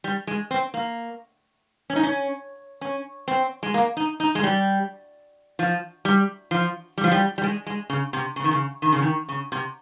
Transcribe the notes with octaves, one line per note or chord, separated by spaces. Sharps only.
G3
G#3
C4
A#3
C#4
D#4
C#4
C#4
C4
G#3
A#3
D#4
D#4
G#3
G3
F3
G3
F3
G3
F3
G3
G3
G#3
G#3
C#3
C3
C#3
D#3
C#3
D#3
C#3
D#3
C#3
C3